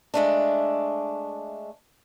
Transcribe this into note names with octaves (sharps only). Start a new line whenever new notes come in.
G#3 A3 D4